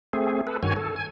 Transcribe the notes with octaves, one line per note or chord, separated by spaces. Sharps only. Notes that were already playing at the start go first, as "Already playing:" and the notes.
A3 C4 G#4
A4 B4
G2 D#3 F#4 C#5 G#5
A4
G#5